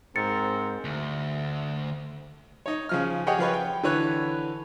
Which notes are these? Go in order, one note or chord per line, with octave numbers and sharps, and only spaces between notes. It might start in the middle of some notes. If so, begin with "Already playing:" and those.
G#2 C4 A#4 A6 C#7
D2
D#4 C#5
C#3 F3 F6
G4 G#4 C#5 D#5 F#5 G5
F3 F4 B4 C#5
G5
D3 E3 B4 C#5 F#6